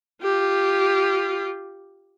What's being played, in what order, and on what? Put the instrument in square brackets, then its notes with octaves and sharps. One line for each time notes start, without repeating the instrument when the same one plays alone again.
[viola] F4 G4